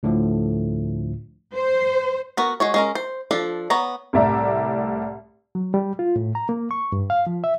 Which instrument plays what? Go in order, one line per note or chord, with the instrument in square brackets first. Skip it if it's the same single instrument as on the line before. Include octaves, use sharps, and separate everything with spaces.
[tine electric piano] D2 A2 D3 F3 A3
[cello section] C5
[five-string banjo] B3 F#4 A#4
G#3 F#4 C#5
G#3 C#4 A#4
C5
F3 D4 A4
B3 C#5 A#5
[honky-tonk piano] C2 A2 D5 E5 A#5
[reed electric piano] F#3
G3
F4
A2
A#5
A#3
C#6
G2
F5
F3
E5